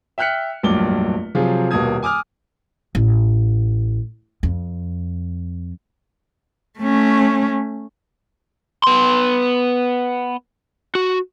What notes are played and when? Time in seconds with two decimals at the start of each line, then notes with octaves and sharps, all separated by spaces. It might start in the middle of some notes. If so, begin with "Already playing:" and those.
0.18 E5 G5 F6 F#6 B6 C#7
0.63 F1 A#1 G2 F#3 D6 G7
1.35 C3 F3 F#3 F4 G#4
1.71 D#1 B2 A#3 A5 D#6 G#6
2.03 G#5 D6 D#6 F6
2.95 A1
4.43 F2
6.79 A3 C#4
8.84 B3 C6
10.95 F#4